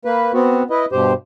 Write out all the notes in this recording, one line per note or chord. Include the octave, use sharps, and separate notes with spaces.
A#3 B4
B3 C4 F#4
E4 B4 D#5
G2 B2 G4 C5